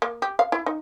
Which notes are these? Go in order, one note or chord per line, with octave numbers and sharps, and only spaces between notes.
A#3
G4
F5
E4
D#4